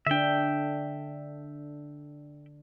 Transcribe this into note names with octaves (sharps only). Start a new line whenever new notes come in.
D3 D4 E5 G5